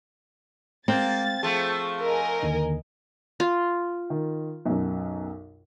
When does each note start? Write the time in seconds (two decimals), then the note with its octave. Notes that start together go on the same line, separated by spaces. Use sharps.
0.88 G#3 A#3 C4 A6
1.43 F3 A3 G#4 A5
2.02 A#4 D#5 G#5
2.43 D#2 D3 D#3
3.40 F4
4.10 D#3
4.65 B1 F#2